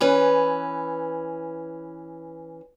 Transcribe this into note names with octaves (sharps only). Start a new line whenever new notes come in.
E3 C#4 B4